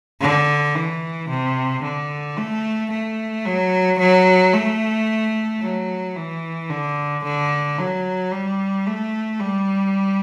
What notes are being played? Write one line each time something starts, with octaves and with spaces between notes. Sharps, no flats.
D3
E3
C3
D3
A3
A3
F#3
F#3
A3
F#3
E3
D3
D3
F#3
G3
A3
G3